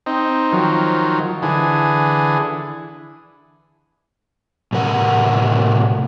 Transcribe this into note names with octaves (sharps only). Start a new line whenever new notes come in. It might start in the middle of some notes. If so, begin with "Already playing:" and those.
C4 D#4
D#3 F3 F#3
D3 E3 G#4
A2 C3 A#4 F#5